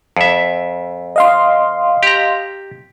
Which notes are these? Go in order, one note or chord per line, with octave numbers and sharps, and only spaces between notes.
F2 E5
D#5 F5 C6
G4 A#5